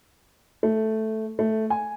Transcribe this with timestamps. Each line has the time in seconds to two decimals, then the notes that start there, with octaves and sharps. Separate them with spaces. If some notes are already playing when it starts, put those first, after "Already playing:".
0.63 A3
1.39 A3
1.70 G#5